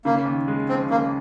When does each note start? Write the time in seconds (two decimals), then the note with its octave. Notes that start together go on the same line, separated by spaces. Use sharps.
0.05 C#3 A#3
0.25 D#2
0.48 G#3
0.69 F3 C4
0.89 C#3 A#3